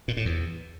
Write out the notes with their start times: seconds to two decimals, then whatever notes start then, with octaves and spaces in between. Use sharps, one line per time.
0.08 A#2
0.17 A2
0.25 E2